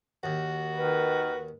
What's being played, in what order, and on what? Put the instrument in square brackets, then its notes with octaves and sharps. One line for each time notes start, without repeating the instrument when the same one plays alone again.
[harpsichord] D#2 [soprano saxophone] F#4
[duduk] D#3 [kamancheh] B4